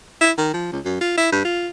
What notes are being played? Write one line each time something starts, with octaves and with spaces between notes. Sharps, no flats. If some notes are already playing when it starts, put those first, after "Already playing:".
E4
D#3
F3
C#2
F#2
F4
E4
G2
F4